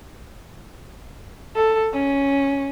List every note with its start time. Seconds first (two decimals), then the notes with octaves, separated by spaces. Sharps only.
1.56 A4
1.94 C#4